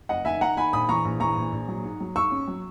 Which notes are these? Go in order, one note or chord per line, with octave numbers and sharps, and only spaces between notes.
F#1 D#5 F#5
D#3 E5 G#5
D#3 F#5 A#5
D#3 G#5 B5
A#1 B5 D#6
E3 A#5 C#6
A#1
E3 A#5 C#6
A#1
A#1
F#3
G#2
F#3
G#2 C#6 E6
C#4
F#3